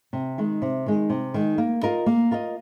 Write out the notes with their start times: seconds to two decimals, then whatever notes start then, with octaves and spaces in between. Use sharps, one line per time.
0.13 C3
0.38 D#3 G#3
0.62 C3
0.86 D#3 G#3
1.10 C3
1.34 D#3 G#3
1.58 A#3
1.83 F4 A#4 D#5
2.06 A#3
2.31 F4 A#4 D#5